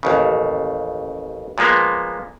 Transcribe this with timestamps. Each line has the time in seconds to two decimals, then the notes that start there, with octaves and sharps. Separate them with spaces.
0.03 A1 D#2 C#3
1.58 A#2 F3 G#3 A#3 B3